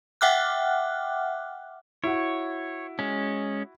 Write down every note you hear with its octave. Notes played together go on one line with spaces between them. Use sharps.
E5 F#5 G5 D6 F6 F#6
E4 F#4 C#5
G#3 C#4